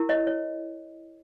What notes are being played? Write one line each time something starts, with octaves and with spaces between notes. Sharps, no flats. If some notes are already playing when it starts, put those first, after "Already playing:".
Already playing: E4 G4 A#4
C#5 D#5
C#5